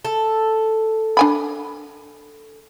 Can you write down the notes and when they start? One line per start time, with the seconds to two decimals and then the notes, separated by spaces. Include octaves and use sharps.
0.05 A4
1.17 D4 G#5 B5